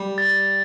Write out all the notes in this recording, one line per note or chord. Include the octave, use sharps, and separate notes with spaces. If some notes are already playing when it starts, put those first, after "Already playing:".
Already playing: G3
A6